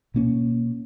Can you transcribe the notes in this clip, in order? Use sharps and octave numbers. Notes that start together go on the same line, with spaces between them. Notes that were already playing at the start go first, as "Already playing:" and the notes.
B2 A#3 C#4